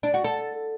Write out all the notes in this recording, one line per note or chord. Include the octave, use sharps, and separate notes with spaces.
D4
F#4
A4